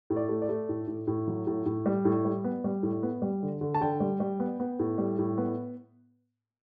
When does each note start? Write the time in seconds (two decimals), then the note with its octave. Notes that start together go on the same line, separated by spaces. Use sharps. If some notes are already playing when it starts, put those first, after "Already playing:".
0.10 A2
0.16 D5
0.29 A3
0.42 D5
0.49 A3
0.69 A2
0.87 A2
1.07 A2
1.28 F#3
1.47 A2
1.66 A2
1.86 G3
2.05 A2
2.25 G3
2.44 B3
2.64 G3
2.83 A2
3.03 B3
3.22 G3
3.43 D3
3.61 D3
3.74 A5
3.81 D3 G5
4.00 G3
4.20 G3
4.40 B3
4.60 B3
4.79 A2
4.98 G3
5.19 A2
5.38 B3